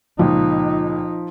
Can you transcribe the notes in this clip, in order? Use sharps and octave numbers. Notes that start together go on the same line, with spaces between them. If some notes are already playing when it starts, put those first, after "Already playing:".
C#2 A#2 F3 D#4